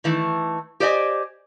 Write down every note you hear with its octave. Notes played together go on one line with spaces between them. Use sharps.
D#3 E3 A3
G4 C5 D5 D#5 G#5